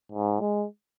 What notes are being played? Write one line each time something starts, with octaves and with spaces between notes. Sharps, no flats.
G#2
G#3